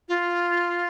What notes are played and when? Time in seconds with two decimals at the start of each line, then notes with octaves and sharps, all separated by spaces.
0.09 F4